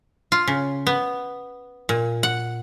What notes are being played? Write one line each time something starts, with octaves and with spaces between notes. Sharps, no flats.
F4
C#3
B3
A#2
F#5